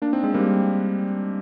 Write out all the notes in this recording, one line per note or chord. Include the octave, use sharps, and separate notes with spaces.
A#3 D4
C4 D#4
G#3 C4
G3 A#3